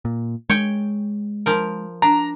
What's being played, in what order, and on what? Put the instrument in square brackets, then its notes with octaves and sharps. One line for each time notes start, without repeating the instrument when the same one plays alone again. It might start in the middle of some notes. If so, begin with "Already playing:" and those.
[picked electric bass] A#2
[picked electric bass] G#3 [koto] C#5 G5
[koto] F3 A#4
[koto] D4 [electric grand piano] A#5